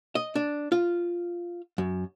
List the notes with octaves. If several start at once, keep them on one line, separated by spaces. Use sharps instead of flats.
D#5
D4
F4
F#2